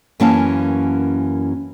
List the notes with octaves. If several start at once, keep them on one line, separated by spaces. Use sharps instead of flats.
F#2 E3 A#3 C#4 F5 A5